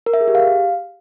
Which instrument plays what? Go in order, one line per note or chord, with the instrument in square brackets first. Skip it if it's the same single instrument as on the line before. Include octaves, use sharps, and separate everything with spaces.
[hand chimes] A#4
E5
G#4
G4
F5